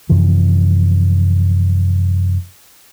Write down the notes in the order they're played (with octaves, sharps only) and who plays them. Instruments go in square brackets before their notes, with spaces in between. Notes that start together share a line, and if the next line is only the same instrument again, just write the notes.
[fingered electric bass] F#2 C3 E3 F3